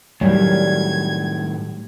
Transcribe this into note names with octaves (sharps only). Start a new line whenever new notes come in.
A2 D#3 F#3 G3 G#6